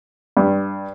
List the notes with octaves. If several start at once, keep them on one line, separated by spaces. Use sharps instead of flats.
G2